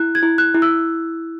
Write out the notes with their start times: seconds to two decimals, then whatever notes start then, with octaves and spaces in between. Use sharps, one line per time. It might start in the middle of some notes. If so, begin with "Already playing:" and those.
Already playing: E4 F#6
0.15 G#6
0.23 E4
0.38 F#6
0.54 E4
0.62 E6